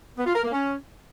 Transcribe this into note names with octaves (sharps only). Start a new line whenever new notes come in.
B3
F4
A#4
A#3
C#4